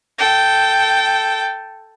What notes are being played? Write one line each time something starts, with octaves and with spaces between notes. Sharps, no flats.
A4 G5